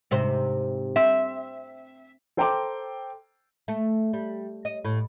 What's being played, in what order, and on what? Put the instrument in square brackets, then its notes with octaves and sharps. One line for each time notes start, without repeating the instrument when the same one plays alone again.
[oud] G#2 C3 C5
[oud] C4 [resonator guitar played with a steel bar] E5
[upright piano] A4 C5 G5 A#5 C6 D6
[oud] A3
G3
D#5
A2